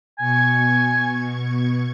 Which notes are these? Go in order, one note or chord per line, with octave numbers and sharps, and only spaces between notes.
B2 G#5 C#6 G#6